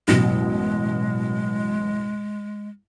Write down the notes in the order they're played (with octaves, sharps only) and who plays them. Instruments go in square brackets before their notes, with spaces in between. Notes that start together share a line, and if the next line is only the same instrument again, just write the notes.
[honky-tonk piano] A1 F#2 B2 [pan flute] G#3